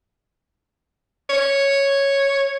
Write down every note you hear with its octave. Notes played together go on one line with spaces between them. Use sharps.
C#5